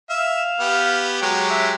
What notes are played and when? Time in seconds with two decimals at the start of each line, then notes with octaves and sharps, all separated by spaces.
0.10 E5 F5
0.60 B3 G4
1.22 F#3 G#3 G4 C#5
1.50 E5